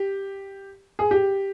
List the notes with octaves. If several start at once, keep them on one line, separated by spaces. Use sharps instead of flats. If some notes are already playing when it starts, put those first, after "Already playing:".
Already playing: G4
G#4
G4